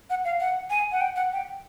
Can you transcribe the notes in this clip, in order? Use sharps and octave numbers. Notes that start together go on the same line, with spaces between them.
F#5
F5
F#5
G#5
F#5
G5
F#5
G5